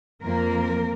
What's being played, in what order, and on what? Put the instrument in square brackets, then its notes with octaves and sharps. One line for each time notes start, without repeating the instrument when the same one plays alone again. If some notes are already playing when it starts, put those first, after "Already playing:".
[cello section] F2 F3 A#3 A#4